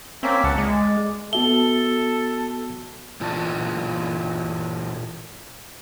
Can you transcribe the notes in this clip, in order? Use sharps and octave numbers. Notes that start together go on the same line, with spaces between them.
A#3 C4 C#4 E5
C#2 F#5 A5
G#3 D5
B3 F#4 A4 E5 G7
A#2 E3 F4 D5 A5